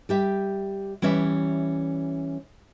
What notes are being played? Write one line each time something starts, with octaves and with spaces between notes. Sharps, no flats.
G3 G4 E5
E3 G3 C#4 C#5 E5